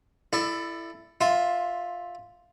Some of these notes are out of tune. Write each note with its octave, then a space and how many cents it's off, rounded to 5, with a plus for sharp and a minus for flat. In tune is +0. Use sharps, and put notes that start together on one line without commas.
E4 +15 A4 +0 D5 +40
F4 +10 E5 -5 C6 +0